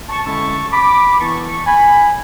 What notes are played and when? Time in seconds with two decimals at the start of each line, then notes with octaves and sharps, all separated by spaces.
0.09 A5 C#6
0.25 D3 G#3 C#4 E4 A5 C#6
0.72 B5 D6
1.19 E3 B3 E4 A5 C#6
1.66 G#5 B5